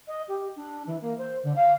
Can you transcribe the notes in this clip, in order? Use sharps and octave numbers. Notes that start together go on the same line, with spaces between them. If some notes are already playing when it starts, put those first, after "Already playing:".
D#5
G4
D4
E3
A#3
C5
D3
F5